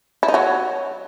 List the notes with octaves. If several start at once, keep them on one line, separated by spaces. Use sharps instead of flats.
E4
D#4
F#3